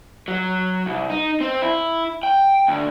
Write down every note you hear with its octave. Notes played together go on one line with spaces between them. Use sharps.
F#3
C2
D#4
C4
E4
G5
D2